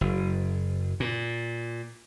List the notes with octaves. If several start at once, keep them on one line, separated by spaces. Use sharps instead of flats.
F#1
A#2